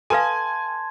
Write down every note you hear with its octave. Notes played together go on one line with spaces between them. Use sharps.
A4 B4 F5 G#5 A5 C6 G#6